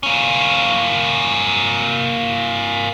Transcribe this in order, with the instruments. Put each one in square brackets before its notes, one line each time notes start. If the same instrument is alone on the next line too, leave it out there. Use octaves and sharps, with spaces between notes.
[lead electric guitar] A#3 C#4